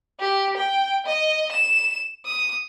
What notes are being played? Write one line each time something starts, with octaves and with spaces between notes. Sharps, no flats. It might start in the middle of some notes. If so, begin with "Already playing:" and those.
G4
G5
D#5
E7
D#6